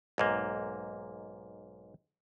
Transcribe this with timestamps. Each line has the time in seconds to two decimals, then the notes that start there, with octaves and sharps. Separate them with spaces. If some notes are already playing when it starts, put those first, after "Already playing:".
0.18 B1 G#2 A#3